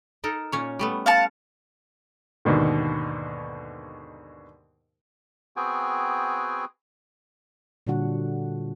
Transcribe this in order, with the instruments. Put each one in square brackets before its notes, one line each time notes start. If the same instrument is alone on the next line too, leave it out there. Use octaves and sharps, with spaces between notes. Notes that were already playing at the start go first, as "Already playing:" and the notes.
[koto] D#4 A4 A#4
A#2 C#4 C#5
G3 A3 B3
[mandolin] F5 F#5 A5
[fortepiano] D#2 G#2 B2 D3
[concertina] B3 C4 F#4 G#4 G5 G#5
[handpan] A#2 D3 G3 D4 F#4 F#5